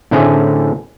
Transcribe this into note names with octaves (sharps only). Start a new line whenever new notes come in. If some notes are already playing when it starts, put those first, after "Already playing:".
A2 D3 A3 C4 C#4 G#4